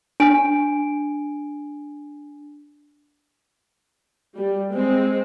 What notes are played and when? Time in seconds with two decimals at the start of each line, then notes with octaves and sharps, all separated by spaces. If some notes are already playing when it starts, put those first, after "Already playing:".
0.20 D4 G#5 D7
4.35 G3
4.72 G#3 C4